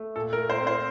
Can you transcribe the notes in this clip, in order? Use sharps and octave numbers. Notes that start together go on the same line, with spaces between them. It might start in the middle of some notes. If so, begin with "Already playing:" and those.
Already playing: A3
A#2 A4
A#4
A3
C5
C4
C5